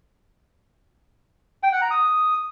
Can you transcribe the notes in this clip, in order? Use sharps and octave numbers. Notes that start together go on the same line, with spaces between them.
G5
F#5
A#5
D#6